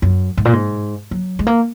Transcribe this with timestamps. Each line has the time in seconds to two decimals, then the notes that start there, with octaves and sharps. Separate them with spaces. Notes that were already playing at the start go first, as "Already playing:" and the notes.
0.02 F#2
0.37 G#2
0.45 A#2
0.53 G#2
1.11 F#3
1.39 G#3
1.47 A#3